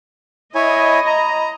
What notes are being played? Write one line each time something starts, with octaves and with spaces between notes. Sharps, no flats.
E4 C#5 D#5 G#5 B5
A#5